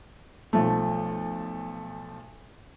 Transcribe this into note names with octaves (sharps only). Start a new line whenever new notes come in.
B1 F3 A3